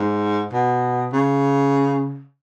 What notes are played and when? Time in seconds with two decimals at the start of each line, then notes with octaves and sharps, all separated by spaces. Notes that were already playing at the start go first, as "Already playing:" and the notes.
Already playing: G#2
0.52 B2
1.13 C#3